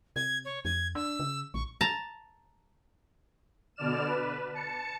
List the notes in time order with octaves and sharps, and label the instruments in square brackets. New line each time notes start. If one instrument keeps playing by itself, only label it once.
[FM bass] C3 [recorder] G#6
[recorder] C#5
[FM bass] F2 [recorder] G#6
[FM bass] D4 [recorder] E6
[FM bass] C#3
[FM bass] A#1 [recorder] C#6
[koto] A5 A#5
[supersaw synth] B2 D3 D5 F6 E7
B4
A5 C#7